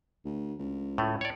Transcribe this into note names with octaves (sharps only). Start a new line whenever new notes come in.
D2
C#2
A2 A3
C#5 D5